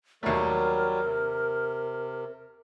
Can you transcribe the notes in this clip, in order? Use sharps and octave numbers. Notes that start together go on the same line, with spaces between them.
D#2 F#3 G3 A3 A#4
C3